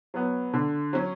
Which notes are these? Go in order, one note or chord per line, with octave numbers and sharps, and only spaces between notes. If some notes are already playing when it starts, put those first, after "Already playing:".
F#3 B3
D3
F#3 C#4